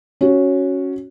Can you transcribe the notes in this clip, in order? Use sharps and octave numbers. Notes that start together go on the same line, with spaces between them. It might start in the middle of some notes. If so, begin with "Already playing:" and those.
C#4 F#4